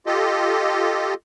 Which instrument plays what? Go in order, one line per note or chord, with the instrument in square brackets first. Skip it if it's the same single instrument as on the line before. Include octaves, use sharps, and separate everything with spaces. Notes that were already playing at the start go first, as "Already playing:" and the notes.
[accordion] F4 G4 A4 D#5